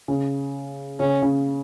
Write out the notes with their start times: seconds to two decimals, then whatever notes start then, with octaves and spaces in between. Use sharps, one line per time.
0.08 C#3
1.00 C#3 C#4
1.22 C#3